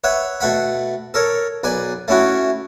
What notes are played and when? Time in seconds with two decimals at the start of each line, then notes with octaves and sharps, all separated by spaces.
0.04 B4 C#5 E5 F#5
0.40 B2 A3 F#5 B5
1.14 A4 A#4 C#5
1.64 B1 B4 D5 G#5
2.08 A3 C#4 E4 F#4